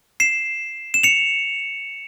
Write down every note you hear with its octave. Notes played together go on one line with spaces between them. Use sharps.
C7 E7
E7
C#7 F7